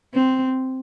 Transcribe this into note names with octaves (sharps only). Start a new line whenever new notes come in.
C4